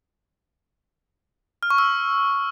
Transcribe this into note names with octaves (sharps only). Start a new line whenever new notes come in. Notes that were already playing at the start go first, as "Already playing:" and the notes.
F6
C#6
E6